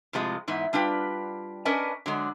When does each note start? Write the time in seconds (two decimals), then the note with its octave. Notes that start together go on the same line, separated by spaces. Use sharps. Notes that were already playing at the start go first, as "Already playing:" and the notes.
0.13 A2 C3 F3 G#3
0.48 G#2 E3 B3
0.73 G3 D4 F4 B4 G5
1.65 C#4 D4 A#4 B4 D#5 G#5
2.06 D3 F#3 G#3